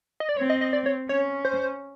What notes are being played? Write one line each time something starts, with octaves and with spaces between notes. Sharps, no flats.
D#5
D5
C4 C#5
D#5
D#5
D5
C#5
C#4 C#5
C5